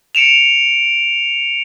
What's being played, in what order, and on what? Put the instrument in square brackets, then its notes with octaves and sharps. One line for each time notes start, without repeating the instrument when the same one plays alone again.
[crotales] C#7 D7 E7 F7